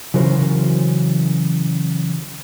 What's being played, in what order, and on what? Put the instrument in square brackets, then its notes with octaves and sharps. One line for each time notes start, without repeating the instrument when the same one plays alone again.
[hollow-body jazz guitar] C#3 E3 F#3 A#4 C5